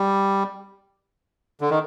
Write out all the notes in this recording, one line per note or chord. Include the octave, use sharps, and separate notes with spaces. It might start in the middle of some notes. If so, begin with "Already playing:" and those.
Already playing: G3
D3
D#3